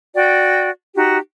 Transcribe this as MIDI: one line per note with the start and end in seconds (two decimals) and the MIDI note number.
0.15 0.69 66
0.15 0.69 74
0.15 0.69 79
0.95 1.18 63
0.95 1.18 66
0.95 1.18 67